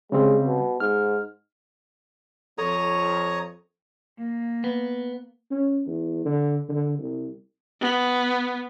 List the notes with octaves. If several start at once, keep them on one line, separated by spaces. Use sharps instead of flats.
C#3 G3 G#3 C4
B2
G#2 F6
F2 A4 C#5 A#5 D#6
A#3
B3
C#4
E2
D3
D3
C2
B3